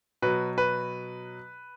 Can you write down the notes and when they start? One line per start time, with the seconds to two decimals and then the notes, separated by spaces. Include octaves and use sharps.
0.22 B2 F#3 B4
0.58 B4